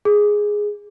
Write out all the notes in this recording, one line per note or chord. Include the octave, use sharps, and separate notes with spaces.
G#4